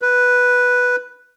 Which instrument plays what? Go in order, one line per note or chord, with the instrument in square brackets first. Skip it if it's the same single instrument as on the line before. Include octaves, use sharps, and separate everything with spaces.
[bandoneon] B4